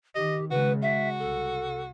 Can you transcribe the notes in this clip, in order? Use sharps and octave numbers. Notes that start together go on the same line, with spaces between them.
D#3 G4 D#5
C#3 G#3 F#4 B4
F#4 E5
C2 A4